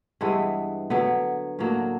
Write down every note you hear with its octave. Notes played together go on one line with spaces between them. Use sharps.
G2 E3 G#3 B3
D3 F#3 B3
A2 F#3 A#3 D4